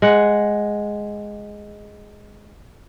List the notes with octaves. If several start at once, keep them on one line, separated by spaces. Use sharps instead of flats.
G#3 F#5